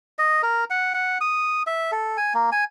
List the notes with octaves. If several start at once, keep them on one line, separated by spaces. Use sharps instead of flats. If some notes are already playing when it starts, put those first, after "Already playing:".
D#5
A#4
F#5
F#5
D#6
E5
A4
G#5
A#3
G#5